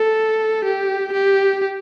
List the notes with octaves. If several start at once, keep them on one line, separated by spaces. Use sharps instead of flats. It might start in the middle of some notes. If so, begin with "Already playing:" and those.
Already playing: A4
G4
G4